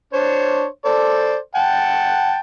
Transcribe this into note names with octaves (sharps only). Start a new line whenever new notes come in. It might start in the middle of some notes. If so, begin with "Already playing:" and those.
D4 C5 C#5
A4 C5 D5
F#5 G5 A5